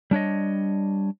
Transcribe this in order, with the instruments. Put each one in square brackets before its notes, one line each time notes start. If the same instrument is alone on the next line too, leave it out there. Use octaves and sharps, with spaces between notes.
[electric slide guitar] G3 D4 C#5 D#5